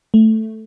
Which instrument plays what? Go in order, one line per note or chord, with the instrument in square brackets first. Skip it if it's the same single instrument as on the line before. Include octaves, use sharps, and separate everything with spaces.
[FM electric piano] A3